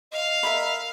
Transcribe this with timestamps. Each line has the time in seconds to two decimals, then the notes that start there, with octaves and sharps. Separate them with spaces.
0.12 D#5 F5
0.43 A#4 E5 B5